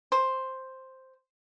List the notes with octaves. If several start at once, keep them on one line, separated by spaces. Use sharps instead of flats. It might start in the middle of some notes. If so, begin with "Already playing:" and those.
C5